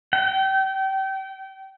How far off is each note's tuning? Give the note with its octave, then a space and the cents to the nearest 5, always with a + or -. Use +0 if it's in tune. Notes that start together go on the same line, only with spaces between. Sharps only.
G5 -30